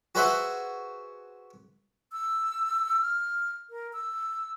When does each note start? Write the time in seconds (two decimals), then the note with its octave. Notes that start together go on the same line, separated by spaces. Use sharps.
0.15 F#4 G#4 B4 C5 E5 F#5
2.12 E6
3.01 F6
3.70 A#4
3.93 E6